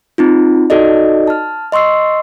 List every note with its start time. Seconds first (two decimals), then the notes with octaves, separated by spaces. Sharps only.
0.18 C4 D#4 F4
0.70 D#4 F#4 A4 D5 D#5
1.27 A5 F6
1.72 D#5 C6 C#6 E6 C7